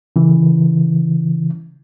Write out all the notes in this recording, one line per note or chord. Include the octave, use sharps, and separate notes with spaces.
C#3 E3